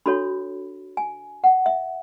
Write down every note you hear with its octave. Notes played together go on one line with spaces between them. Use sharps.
D4 F#4 A4 C#5 B5
G#5
F#5
E5